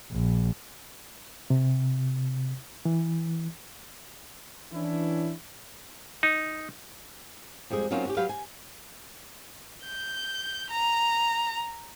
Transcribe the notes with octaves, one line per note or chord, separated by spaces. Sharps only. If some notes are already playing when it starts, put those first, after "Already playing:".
A#1
C3
E3
E3 C#4 D4 E4
D#4
F2 G3 G#3 G#4
F#3 A#3 C4 C#4 D#4 F4
C#4 F#4 G4
F#3 G4 B4 F5
G#5
G6
A#5